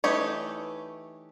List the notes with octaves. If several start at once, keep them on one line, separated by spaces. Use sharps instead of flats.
E3 A3 D#4 G4 C#5